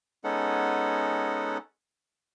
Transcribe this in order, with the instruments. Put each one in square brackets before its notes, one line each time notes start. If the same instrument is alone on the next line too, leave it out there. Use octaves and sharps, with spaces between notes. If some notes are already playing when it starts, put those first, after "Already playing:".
[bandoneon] G#3 B3 C#4 D#4 A4 F#5